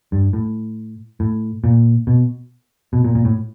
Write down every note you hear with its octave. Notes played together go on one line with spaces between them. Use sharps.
G2
A2
A2
A#2
B2
B2
A#2
A#2
A2